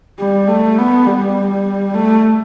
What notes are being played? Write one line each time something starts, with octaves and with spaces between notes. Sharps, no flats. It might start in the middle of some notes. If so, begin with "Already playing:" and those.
G3
A3
B3
G3
A3